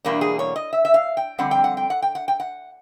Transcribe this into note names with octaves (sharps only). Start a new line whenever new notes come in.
E2 B2 G3 A#3 D4
G#4
C#5
D#5
E5
E5
F5
G5
F2 D3 G3 C4 F#5
G5
F#5
G5
F#5
G5
F#5
G5
F#5